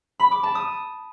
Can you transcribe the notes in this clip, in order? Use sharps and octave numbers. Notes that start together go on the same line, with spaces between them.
B5
D6
A5
D#6